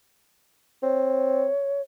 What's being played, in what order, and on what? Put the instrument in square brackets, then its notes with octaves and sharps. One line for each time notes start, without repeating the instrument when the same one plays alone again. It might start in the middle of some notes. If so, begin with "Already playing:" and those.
[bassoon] C4 [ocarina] C#5